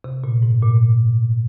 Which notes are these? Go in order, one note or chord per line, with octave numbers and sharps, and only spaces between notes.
C3
A#2
G#2
A#2